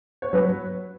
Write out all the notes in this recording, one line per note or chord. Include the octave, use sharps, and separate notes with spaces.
C#5
F#3 B4